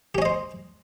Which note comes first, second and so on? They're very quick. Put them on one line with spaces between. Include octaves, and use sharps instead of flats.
G4 C#4 D#5 C5